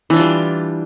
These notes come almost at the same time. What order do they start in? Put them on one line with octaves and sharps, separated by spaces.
E3 D4 F4 G3